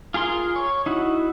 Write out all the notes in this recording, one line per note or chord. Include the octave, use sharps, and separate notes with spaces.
F4 G#4 A#4 C6
C#5
D#4 E4 F#4